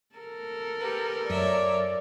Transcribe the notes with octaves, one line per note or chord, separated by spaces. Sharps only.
A4 A#4
G4 B4
F#2 C#5 D5 E5